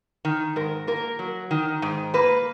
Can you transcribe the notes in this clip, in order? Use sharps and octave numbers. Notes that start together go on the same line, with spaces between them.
D#3
G#2 A#4
A#3 A#4
F#3
D#3
G#2
A#3 B4